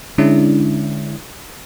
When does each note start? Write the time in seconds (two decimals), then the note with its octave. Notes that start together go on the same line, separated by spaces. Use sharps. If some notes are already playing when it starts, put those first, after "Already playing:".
0.18 D3 G#3 C#4 D4 E4